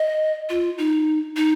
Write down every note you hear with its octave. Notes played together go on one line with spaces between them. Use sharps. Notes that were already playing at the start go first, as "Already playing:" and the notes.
Already playing: D#5
F4
D#4
D#4